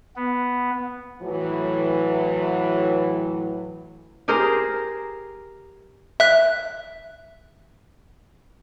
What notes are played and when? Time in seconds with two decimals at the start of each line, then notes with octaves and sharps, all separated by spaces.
0.16 B3
1.22 A2 E3 F#3
4.28 G4 G#4 A#4 C5
6.20 E5 F#6